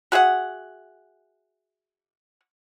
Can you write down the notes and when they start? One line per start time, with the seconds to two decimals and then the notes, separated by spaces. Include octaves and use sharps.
0.12 F#4 G#4 E5 F#5